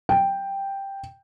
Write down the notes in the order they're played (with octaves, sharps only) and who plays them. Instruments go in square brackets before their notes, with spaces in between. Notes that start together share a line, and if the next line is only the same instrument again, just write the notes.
[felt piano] G5